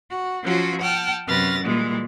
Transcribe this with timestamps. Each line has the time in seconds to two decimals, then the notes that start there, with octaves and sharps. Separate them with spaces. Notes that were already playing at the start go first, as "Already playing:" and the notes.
0.10 F#4
0.43 F3 F#3 C#4 F4 F#4
0.81 F#5 G5 A5 F6
1.27 F#2 C3 B4 F6 A6 A#6
1.64 A#2 E3 G3 G#3